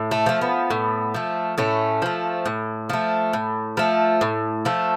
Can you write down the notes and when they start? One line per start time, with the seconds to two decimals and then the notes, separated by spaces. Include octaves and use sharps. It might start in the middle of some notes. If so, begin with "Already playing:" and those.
Already playing: A2
0.11 A3
0.26 F3 A3
0.41 B3
0.70 A2
1.14 F3 A3
1.58 A2 A3 C#4
2.02 F3 A3
2.46 A2
2.89 F3 A3
3.33 A2
3.77 F3 A3
4.21 A2
4.65 F3 A3